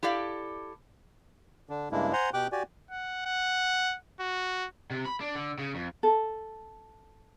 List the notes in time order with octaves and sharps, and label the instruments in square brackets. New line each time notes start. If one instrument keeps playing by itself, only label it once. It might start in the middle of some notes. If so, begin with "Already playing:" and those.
[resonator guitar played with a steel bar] E4 G4 A4 D5 F5
[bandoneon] D3 D4
G2 C#3 G#3 A#3 D4 E4
C5 F#5 G#5 A#5 C6
B2 G4 G5 D6 F#6
F#4 G4 D5 G#5
[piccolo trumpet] F#5
F#5
F#4
[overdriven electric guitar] C3
B5
D4
D3
C#3
F2
[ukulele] A4